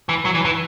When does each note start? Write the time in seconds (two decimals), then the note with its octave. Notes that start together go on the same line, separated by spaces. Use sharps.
0.09 E3
0.25 F#3
0.35 E3
0.45 E3